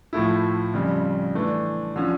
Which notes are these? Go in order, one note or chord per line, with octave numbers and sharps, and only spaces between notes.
A2 F3 A3 E4
F2 C#3 G3
E3 A3 D4
D3 F3 C#4